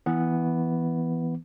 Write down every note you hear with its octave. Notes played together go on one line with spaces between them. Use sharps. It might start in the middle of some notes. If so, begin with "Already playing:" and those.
E3 B3